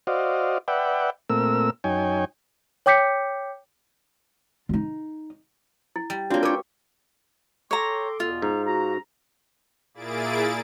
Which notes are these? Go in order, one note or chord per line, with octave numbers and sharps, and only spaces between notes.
F#4 C5 D5 D#5 F5
B4 D5 E5 F#5 G5
A#2 A3 C4 A#4 E6
F#2 D#4 C#5 G5 G#5
C#5 G5 D6 G6 B6 C#7
D#4 F4
E4
G3
A#3 C4 D4 F4 F#4 C#5 G5
A#4 B4 C#5 D6
A4 C#5 G5 A#5 C6 D6
E2 B2 B3 F4
G#2 A#5
F#4 A#5
A#2 A#3 E4 G#4 A6 D7